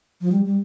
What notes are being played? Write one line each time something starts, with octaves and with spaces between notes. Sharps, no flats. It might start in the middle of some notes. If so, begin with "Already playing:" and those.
F3
G3
G3